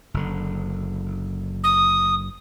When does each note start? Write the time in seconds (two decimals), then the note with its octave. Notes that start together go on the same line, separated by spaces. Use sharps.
0.14 F#1 D3
1.63 D#6